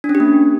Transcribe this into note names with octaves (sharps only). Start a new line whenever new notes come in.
D4
C#4
G4
A#3